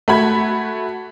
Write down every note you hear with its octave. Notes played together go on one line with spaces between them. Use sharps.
A3 F#4 B5 G#6